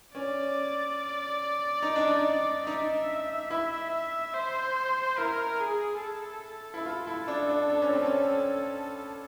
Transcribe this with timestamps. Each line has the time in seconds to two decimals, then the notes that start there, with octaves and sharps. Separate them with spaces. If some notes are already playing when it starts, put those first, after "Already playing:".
0.15 C#4 D5
1.82 D#4
1.96 D4
2.07 D#4
2.66 D#4 E5
3.50 E4 E5
3.92 E5
4.34 C5
5.18 E4 A#4
5.60 G#4
6.02 A4
6.74 E4
6.86 F4
7.07 E4
7.28 D4
7.49 D4
7.70 D4
7.82 C#4
7.93 C4
8.06 C#4